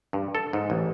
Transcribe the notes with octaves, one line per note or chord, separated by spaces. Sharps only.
G2
A4
G#2
A1